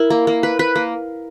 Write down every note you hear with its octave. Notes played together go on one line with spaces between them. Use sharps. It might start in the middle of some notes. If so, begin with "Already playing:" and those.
Already playing: E4 A#4
A#3
A#3
B4
B4
A#3